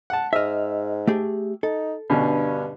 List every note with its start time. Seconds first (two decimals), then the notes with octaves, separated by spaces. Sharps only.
0.10 F#5 A5
0.33 G#2 D#5 E5 E6 F6
1.07 A3 G4 G#4
1.63 D#4 A4
2.10 G2 B2 D3 C#4